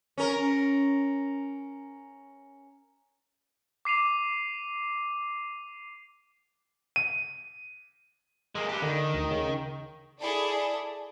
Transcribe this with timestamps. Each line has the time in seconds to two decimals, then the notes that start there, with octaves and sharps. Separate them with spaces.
0.18 C#4 A#4
3.85 D6 C7 D#7 F7
6.96 D#7
8.55 G#3 A#3
8.69 G4 B4
8.82 D3 D#3
9.14 D2
9.31 C#3
10.21 E4 G#4 A4 D5